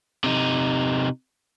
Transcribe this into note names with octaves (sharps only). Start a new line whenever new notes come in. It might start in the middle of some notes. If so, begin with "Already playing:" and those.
C3 D#4